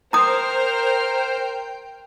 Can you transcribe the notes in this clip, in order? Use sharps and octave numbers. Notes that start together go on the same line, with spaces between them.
A#4 C5 G5 A#5 D#6 F6